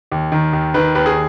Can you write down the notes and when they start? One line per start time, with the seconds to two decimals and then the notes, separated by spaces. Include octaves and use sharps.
0.12 D#2
0.32 D#3
0.53 D#2
0.74 D#3 B4
0.95 D#2 B4
1.06 G#4